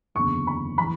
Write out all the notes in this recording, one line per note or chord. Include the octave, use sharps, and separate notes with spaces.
F#1 E2 D3 C#6
B5
E3 B5